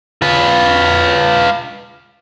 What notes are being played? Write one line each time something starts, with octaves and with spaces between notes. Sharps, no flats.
F4 B4